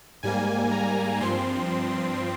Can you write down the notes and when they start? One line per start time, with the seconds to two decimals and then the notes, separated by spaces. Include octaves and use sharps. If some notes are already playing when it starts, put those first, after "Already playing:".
0.23 G#2 G3 A#3 G#5
0.71 A#5
1.21 G2 F3 C4 C6